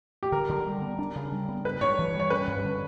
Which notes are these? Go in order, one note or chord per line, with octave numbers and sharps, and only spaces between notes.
G4
D3 A#4
D3
G3
B3
D4
C#3
G3
B3
G2 B4
G2 C#5
E3
G3
C#5
C#4 B4
G2
D3